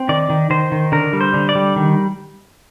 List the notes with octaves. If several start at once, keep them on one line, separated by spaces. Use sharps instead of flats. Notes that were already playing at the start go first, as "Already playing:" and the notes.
Already playing: C4
D#3 D5
D#3
D#3 C5
D#3
D3 A#4
G3
C5
D3
D5
G3
D#3